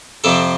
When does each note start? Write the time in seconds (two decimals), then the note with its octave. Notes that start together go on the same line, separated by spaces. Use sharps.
0.24 F2 C3 F3 A4